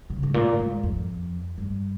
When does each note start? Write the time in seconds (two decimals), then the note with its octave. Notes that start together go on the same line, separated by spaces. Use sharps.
0.10 C#3
0.23 G#2
0.34 A#2
0.59 G#2
0.83 F2
1.58 G2